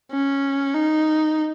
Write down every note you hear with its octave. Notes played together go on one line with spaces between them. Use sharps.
C#4
D#4